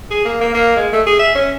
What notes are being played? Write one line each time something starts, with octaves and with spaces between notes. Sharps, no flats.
G#4
A#3
A#3
A#3
G#3
A3
G#4
E5
C#4